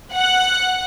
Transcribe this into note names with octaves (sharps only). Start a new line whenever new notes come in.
F#5